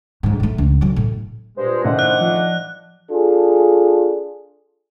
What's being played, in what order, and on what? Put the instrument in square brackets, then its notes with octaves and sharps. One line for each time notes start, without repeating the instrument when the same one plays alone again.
[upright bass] D2 G#2
A2 A3
C#2
D2 F#3
A2
[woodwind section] G2 A#2 G#3 [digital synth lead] C5
[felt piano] A2 D#3 C#4 [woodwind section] D4 D#5 F#5
[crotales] F#6
[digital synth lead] F3
[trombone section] D4 F4 G#4 A4